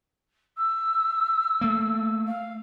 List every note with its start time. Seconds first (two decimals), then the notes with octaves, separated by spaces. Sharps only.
0.58 E6
1.61 A3 A#3
2.28 F5